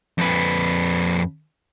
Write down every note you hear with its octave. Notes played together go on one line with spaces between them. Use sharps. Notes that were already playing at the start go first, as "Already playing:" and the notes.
F2 B4